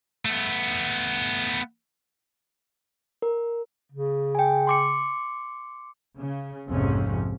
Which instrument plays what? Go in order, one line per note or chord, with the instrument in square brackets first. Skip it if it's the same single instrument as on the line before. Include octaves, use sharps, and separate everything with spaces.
[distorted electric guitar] A3 B3
[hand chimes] A#4
[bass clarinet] C#3
[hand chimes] G5 G#5
C6 D6 C#7
[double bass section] C#3
A#1 F2 G#2 C3 C4 C#4